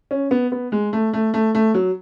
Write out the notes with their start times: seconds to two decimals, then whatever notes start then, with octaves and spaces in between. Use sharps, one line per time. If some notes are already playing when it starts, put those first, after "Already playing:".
0.11 C#4
0.31 B3
0.52 B3
0.72 G#3
0.93 A3
1.13 A3
1.34 A3
1.55 A3
1.74 F#3